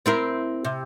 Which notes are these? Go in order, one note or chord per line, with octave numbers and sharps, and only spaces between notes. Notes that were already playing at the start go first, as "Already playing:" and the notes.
C4 E4 A#4
C3